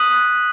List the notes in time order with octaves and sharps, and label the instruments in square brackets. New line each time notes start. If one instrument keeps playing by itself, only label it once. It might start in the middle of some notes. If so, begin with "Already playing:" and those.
Already playing: [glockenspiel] D#6 F#6 B6 D#7 F#7